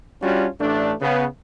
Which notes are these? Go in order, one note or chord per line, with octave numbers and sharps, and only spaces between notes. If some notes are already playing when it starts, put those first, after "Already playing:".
G3 C#4 D4 F4 F#4
A1 A3 D4
C#3 B3